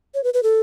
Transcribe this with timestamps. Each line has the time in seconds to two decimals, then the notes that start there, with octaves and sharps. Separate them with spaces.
0.14 C#5
0.24 B4
0.34 B4
0.43 A4